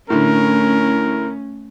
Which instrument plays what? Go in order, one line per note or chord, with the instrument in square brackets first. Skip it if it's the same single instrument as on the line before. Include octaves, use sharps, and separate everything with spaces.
[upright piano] A2 D3 [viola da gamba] A3 [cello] C#4 [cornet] A#4